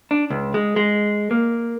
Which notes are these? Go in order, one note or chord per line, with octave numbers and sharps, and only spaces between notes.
D4
C#2
G#3
G#3
A#3